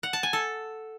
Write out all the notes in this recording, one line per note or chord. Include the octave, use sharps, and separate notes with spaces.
F#5
A5
G#5
A4